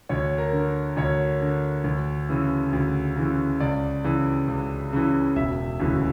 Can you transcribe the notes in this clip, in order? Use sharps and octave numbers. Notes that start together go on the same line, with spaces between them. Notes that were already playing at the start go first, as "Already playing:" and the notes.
D2 C#5
A#4
D3
D2 C#5
D3
D2
C#3 E3
D2
C#3 E3
C#2 D5
C#3 E3
C#2
C#3 E3
E1 E5
D2 C#3 E3